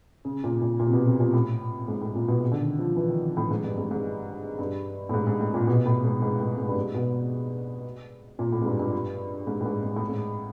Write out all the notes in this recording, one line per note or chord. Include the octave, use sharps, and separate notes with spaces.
C#3
A#2
A#2
A#2
C3
B2
C3
A#2
A2
G#2
A2
A#2
B2
D3
D#3
F3
E3
D#3
A2
G#2
G2
G#2
G#2
G2
A2
G#2
G#2
A2
A#2
B2
A2
G#2
G#2
A2
G#2
G2
G#2
B2
A#2
A2
G#2
G2
G2
G#2
A2
G#2
G#2
A2
G#2